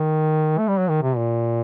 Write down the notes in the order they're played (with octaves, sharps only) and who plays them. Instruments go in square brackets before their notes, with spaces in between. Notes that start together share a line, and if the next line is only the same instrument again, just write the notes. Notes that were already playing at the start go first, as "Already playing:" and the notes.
Already playing: [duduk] D#3
A3
G3
F#3
D#3
C3
A#2